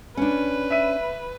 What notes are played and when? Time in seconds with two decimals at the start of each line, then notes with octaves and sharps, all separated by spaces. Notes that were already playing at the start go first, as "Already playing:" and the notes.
0.17 C#4 D4 B4
0.70 E5 D#7